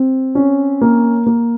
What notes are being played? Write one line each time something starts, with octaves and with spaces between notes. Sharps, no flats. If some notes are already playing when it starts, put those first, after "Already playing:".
Already playing: C4
C#4
A#3
A#3